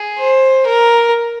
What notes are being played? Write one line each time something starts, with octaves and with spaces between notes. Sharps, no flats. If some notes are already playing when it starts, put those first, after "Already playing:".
Already playing: G#4
C5
A#4